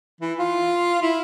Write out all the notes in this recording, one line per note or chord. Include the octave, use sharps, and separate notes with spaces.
E3
F4
E4